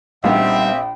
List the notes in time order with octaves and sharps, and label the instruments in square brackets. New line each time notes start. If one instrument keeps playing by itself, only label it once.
[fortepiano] A#1 [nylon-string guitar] G3 B3 D#4 [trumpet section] C4 E5 [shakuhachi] G5